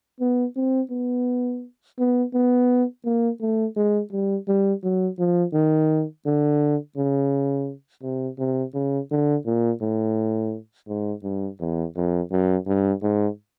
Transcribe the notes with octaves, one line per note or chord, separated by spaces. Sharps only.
B3
C4
B3
B3
B3
A#3
A3
G#3
G3
G3
F#3
F3
D#3
D3
C#3
C3
C3
C#3
D3
A#2
A2
G#2
G2
E2
F2
F#2
G2
G#2